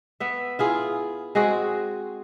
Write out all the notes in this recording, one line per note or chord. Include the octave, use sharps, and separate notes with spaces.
B3 E5
E4 F4 G#4
G#3 C4 F#4 G#4